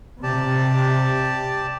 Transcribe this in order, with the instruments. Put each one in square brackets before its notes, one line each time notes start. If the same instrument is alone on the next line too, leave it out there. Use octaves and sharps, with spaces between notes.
[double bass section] C3 [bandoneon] G4 D5 A5